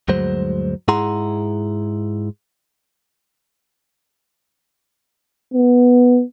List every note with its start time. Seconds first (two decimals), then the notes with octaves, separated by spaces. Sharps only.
0.08 D2 G2 F#3 G#3 C5
0.88 G#2 E4 G#4 F#5 A#5 C6
5.54 B3